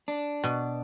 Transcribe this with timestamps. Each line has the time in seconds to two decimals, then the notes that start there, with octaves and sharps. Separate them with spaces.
0.08 D4
0.44 B2